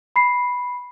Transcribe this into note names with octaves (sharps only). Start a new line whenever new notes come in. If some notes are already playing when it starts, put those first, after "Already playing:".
B5 C7